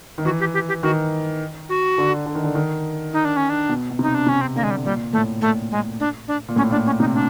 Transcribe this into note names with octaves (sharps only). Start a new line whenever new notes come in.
D#3
E3 F#4
G4
G4
G4
D#3 F#4
F#4
D3
D3
D#3
D3
D#3
D#4
D4
C#4
D4
B2
B2
C3
D#4
D4
C3 C#4
C4
D3 A#3
G#3
G3
A#2 G3
A2 A3
A#2 A3
G#3
D4
D4
A#2
A2 C#4
A#2 D4
C#4
C3 D#4
D4